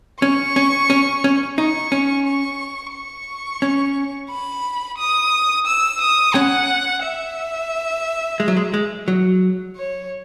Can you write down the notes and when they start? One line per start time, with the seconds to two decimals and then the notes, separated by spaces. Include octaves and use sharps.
0.21 C#4 C#6
0.56 C#4
0.90 C#4
1.24 C#4
1.58 D#4 C#6
1.92 C#4
2.26 C#6
2.94 C#6
3.62 C#4
4.31 B5
4.98 D#6
5.66 E6
6.01 D#6
6.34 C#4 F#5
7.03 E5
8.40 G#3
8.48 F#3
8.57 G#3
8.74 G#3
9.08 F#3
9.76 C#5